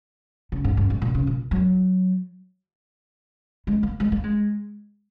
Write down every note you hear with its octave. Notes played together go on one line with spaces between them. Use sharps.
C#3
G#2
F#2
G#2
A#2
C#3
A#2
F#3
G#3
A#3
G#3
A#3
G#3